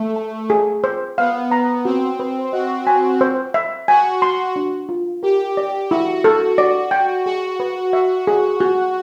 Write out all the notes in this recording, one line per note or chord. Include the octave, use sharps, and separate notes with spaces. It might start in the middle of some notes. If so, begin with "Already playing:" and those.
Already playing: A3
A5
G#4
C5
B3 F5
A#5
C4 F#4
B4
F#4 D#5
G#5
C5
E5
F#4 G#5
C6
D4
F4
G4 A#4
D5
E4 F#4
A4
D5
G5
F#4 G#4
B4
E5
G#4
F#4